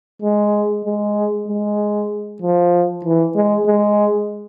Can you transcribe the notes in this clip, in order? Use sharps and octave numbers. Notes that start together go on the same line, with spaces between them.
G#3
G#3
G#3
F3
E3
G#3
G#3